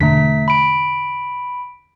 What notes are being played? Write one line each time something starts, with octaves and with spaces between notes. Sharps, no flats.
E1 D3 A3 B6
B5 D7